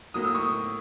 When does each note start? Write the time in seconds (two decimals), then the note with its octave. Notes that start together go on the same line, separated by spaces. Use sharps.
0.14 A2 F#3 A#3 D#6
0.24 E6
0.35 C#6 D#6